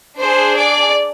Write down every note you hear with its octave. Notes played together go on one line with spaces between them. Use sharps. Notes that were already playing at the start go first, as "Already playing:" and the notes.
D4 G#4 C5
D5